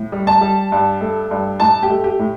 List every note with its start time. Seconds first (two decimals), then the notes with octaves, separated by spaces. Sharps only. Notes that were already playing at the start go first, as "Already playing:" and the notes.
Already playing: A2
0.12 G3
0.27 A5
0.41 G3
0.72 G2
1.01 A3
1.31 G2
1.60 A2 A5
1.83 G4
1.90 A3
2.04 G4
2.19 A2